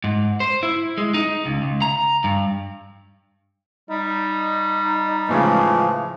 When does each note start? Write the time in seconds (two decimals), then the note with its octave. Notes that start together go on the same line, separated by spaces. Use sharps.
0.04 G#2
0.40 C5
0.63 E4
0.98 G#3
1.14 D#4
1.46 C#2
1.62 C#2
1.82 A#5
2.24 G2
3.90 G3 D#4
5.29 A2 C#3 E3 F3 G#3